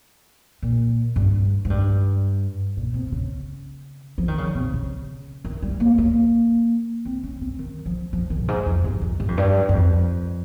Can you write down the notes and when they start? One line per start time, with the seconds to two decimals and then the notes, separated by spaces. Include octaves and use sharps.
0.63 A#2
1.16 G2
1.65 G#2
1.70 G2
2.77 A#2
2.94 C3
3.12 C#3
4.18 F3
4.28 D#3
4.38 C#3
4.55 C3
4.73 C#3
5.45 D#3
5.62 G3
5.80 A#3
5.98 A#3
7.05 C4
7.23 C#4
7.41 C4
7.59 D#3
7.86 F3
8.13 F3
8.30 D#3
8.42 G2
8.48 G#2
8.66 F2
8.84 G2
9.02 F2
9.20 G2
9.28 F2
9.37 G2
9.69 G2
9.73 F2